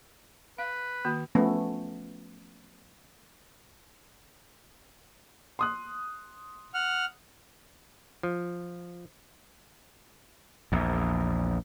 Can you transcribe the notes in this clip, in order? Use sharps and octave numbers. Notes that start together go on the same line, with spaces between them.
B4 F5
D#3 A#3 F#4
F3 A3 B3 C#4
C6 D#6 F#6
F#5 F6
F3
A#1 E2